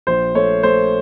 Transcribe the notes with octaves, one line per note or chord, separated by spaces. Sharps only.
A#1 C5
A3 C#5
A3 C5